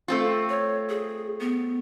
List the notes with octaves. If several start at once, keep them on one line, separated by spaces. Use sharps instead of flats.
A3 C4 F4
C#5
G#4
B3